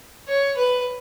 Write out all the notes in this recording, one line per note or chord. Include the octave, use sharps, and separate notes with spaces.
C#5
B4